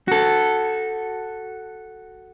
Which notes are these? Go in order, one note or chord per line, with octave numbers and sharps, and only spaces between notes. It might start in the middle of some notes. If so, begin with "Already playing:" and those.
F#4 A4